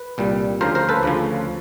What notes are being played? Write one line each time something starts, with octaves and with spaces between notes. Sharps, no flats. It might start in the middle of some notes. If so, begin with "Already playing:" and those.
Already playing: B4
C2 A#2 G3
D2 C#3 F3 A#4 C5
A#4 C5
A4 B4
D2 C#3 F3